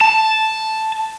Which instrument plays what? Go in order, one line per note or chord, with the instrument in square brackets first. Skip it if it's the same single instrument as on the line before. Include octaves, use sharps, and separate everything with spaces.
[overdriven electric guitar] A5